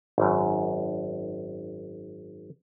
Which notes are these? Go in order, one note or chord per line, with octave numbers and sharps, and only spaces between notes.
G#1 F#2